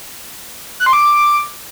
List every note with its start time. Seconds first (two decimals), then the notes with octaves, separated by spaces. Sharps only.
0.80 F#6
0.86 C6
0.93 D6